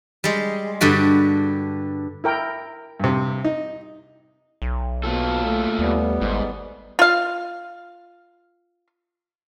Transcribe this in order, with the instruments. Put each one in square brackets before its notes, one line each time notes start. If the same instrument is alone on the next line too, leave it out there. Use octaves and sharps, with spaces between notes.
[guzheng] G3 G#3
G2 D3 G3 F#4 B5
[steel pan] E4 A#4 G5
[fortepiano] G2 C3
D#4
[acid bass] B1
[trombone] B2 [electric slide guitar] A#3 F4 A4
[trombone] A3
[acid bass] D#2 [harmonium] G3 B3
[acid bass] G#1 [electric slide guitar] G#2
[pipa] F4 F5